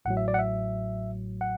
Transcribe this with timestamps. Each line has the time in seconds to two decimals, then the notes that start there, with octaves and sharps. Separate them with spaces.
0.05 A1 A2 F#3 F#5
0.17 E5
0.28 D5
0.34 F#5
0.39 E5
1.41 F#5